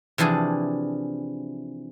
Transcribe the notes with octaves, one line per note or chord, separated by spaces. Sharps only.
C3 E3 F3 D4 G#4